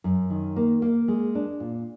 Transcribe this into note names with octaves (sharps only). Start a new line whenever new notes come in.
F#2
D#3
A#3
A#3
G#3
D4
A#2